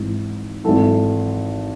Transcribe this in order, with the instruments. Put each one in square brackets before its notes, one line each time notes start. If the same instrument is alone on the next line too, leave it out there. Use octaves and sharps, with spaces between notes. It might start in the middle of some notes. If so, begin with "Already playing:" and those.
Already playing: [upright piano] G#1 G#2 E3
G#1 G#2 E3 A4